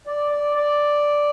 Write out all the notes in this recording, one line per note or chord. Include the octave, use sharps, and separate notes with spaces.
D5
D5
D5